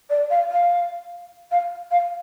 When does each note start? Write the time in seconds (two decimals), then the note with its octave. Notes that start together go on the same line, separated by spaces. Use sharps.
0.10 D5
0.31 F5
0.50 F5
1.51 F5
1.91 F5